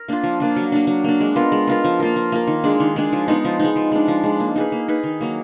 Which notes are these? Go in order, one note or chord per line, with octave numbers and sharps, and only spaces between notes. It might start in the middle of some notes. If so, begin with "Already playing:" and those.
Already playing: A#4
A#3 D4 F4
F3
A#3 D4 F4
F#3
A#3 D4
F#3
A#3 D4
G#3
B3 F4 A#4
G#3
B3 F4 A#4
F3
A#3 F4 A#4
F3
A#3 F4 A#4
D#3
G#3 D4 G#4
D#3
G#3 D4 G#4
F3
G#3 B3 D#4
F3
G#3 B3 D#4
F3
G#3 D4
F3
G#3 D4
A#3
D#4 G#4 B4
A#3
D#4 G#4 B4
D#3
F#3 A#3